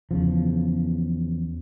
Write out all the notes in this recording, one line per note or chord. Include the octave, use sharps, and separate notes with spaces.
E2 C#3 F3